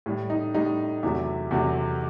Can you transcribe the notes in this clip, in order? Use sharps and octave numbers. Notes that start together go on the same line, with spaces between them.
A2 G3
D#4
A2 G3 D#4
E2 C3 F#3 A3 E4
E2 C3 F#3 A3